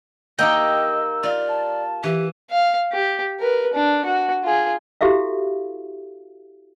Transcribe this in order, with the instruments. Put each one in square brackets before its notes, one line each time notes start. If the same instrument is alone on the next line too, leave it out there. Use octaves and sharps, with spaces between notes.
[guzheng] A#3 D#4 G4 [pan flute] D#5 [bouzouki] G5 [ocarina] E6
[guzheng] F4 [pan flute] D5
[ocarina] A5
[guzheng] E3 [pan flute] G4
[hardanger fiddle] F5
G4
A#4 B4
D4
F#4
F4 G#4
[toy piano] E4 F#4 G4 A4 E5 F5